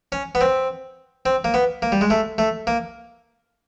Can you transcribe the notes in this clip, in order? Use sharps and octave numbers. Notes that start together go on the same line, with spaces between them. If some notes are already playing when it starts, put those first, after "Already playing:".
C#4
B3
C4
C4
A#3
B3
A#3
G3
G#3
A3
A3
A#3